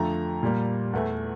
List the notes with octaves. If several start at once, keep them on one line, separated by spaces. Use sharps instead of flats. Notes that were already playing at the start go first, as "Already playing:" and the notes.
Already playing: F2 D3 F3 A3 A#5
A#2 G3 A#3
E2 E3 A3